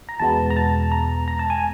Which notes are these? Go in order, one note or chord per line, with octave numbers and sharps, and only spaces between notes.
A#5
E2 B2 G#3 B3 A5
A#5
A5
A#5
A#5
A5
G#5